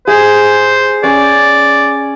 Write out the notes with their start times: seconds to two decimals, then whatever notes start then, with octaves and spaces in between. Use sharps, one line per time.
0.07 G#4 C5
1.04 C#4 D5